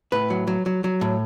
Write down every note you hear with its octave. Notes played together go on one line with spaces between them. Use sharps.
A2 B4
F#3
F#3
F#3
F#3
A2